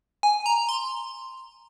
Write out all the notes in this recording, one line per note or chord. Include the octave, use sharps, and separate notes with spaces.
G#5
A#5
C6